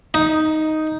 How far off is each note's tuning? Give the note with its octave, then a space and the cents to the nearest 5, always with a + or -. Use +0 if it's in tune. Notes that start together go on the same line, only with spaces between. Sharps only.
D#4 +5